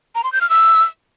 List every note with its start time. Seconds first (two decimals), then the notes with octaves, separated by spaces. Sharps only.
0.15 A#5
0.24 C6
0.33 G6
0.41 F6
0.50 E6